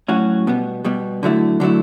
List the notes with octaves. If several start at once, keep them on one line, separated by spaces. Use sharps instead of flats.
A2 F#3 C#4 F#4
B2 G3 B3
B2 G3 B3
D3 F#3 A3 E4
D3 F#3 A3 E4